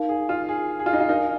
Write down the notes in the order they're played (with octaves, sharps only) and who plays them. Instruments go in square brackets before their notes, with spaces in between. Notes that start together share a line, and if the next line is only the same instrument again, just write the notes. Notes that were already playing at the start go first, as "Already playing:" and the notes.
Already playing: [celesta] D#4 A#4 F5
[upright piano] G#4
F4
G#4
G#4
F4
D#4
F4
[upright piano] D#4 [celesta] A#4 F5 G#5